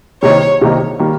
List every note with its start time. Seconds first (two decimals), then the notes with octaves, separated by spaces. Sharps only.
0.22 C2 C3 D#3 A#3 D#4 C#5
0.61 C2 C3 D#3 A#3 D#4
0.99 D#3 G3 A#3